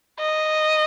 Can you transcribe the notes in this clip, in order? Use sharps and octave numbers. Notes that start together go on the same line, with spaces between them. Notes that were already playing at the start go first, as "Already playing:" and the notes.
D#5